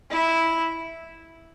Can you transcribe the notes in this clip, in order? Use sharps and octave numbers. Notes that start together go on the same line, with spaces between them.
E4